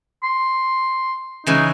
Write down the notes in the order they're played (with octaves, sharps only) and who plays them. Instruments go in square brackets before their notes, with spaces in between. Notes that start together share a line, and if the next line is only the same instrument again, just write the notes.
[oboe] C6
[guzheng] C#3 E3 G#3 [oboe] D#4